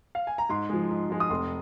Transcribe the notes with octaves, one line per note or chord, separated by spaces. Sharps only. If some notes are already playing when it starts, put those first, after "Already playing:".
F5
G#5
A#5
G#2 C6
F3 G#3
G#2
F3 G#3
D#6
F1 C6